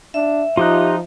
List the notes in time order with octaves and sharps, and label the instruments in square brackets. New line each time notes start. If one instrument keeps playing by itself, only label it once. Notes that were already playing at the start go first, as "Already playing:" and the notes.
[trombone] D4 [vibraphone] E5
[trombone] F3 [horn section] D#4 [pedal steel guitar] F4 G4 F#6